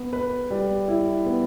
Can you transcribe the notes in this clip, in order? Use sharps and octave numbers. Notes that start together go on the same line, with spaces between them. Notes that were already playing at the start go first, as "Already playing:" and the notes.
Already playing: B3
B4
G3
E4
B3